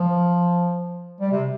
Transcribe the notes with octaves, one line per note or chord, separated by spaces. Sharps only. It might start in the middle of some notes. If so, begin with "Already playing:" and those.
Already playing: F3
G3
C3